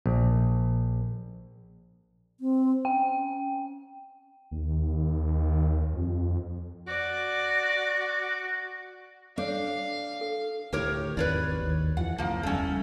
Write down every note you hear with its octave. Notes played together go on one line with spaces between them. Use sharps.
A#1
C4
C#4 G5
D#2
F2
F#4 D5
D4 A4 C#5 F5
A4
D2 A2 G4 A#4 C#5
G#1 E2 B4 C#5 D5
D#2
F2 E3 F#5
C#2 F#2 F3 A#3
F#1 E2 G3 A3 C#4